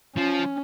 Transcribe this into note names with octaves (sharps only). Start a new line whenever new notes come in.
F3 C#4